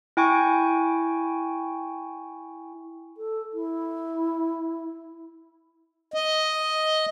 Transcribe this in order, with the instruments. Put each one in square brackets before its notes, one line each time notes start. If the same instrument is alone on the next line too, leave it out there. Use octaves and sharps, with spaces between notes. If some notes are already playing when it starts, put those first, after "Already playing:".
[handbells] E4 G5 G#5 C#6
[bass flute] A4
E4
[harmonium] D#5